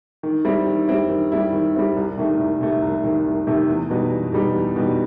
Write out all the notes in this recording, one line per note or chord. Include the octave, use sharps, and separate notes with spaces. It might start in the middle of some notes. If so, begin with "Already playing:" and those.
D#3
G3 C4 E4
D#3
G3 C4 E4
D#3
G3 C4 E4
D#3
G3 C4 E4
C2
C3 D#3 A3
C2
C3 D#3 A3
C2
C3 D#3 A3
C2
C3 D#3 A3
E2
B2 G3 D#4
E2
B2 G3 D#4
E2
B2 G3 D#4